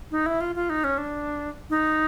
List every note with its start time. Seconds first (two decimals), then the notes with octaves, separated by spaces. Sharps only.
0.11 D#4
0.26 E4
0.41 F4
0.55 F4
0.70 D#4
0.84 C#4
0.98 D4
1.70 D#4